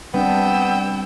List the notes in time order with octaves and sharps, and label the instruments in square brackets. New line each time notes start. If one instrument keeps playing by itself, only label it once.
[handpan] G3 C4 D4 [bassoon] B3 [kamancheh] G5 E6